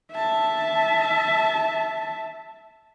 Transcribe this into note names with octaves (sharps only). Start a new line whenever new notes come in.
E5 A5